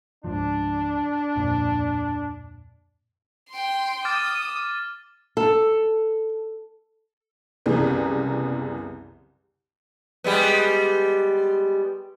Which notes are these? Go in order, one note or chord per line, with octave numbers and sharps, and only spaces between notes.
C#2 G#2 F3 D4
D1 F2 A#2
G5 C6
D6 D#6 F6 A6
A4
C2 F#2 C#3 E3 B3
G3 G#3 B3